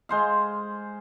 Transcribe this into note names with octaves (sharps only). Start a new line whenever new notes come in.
G#3 C5 F5